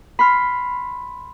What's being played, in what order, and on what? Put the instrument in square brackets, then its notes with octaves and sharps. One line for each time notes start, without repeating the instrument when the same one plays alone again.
[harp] B5 C6 F6